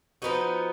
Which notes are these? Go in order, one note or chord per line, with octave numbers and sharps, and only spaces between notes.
F3 B3 D#4 F#4